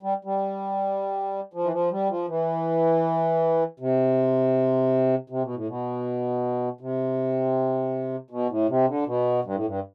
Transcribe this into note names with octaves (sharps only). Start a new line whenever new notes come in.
G3
G3
F3
E3
F3
G3
F3
E3
C3
C3
B2
A2
B2
C3
B2
A2
C3
D3
B2
G2
A2
G2